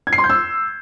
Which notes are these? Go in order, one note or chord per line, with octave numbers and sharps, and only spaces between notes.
G#6
C7
C6
G6
E6